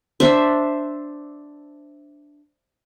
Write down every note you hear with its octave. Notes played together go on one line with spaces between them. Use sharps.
D4 C5 E5